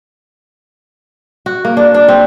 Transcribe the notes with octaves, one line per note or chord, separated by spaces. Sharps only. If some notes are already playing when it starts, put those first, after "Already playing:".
F#4
A#3
D4
D4
C4